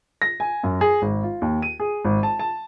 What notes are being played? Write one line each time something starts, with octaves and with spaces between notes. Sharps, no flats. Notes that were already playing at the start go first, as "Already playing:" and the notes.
A#6
G#5
F#2
G#4
G#1
F4
D#2
D#7
G#4
G#1
A5
A5